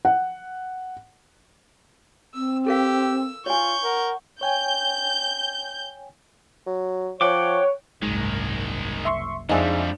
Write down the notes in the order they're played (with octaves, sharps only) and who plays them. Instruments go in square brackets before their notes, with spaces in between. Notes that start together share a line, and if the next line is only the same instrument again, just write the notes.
[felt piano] F#5
[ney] C4 [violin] E6
[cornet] G4 [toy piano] A4 A#4 F5 [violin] E6
[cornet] F4 [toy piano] C#5 G#5 [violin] C#6 G6
[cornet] A#4 [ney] F#5
[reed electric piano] C#5 G5 G#5 [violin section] G6
[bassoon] F#3
[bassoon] F3 [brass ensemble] C#5 [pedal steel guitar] F#5 G5 D6
[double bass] F#1 C2 [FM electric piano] G#2 [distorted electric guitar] D#3 G#3
[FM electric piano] E5 C6 C#6
[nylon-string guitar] F2 D4 [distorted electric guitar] G3 G#3 [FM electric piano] D#4 G#4 E5